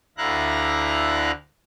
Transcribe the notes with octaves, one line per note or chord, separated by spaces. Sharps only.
D2 D3 E4 F5 A#5 F#6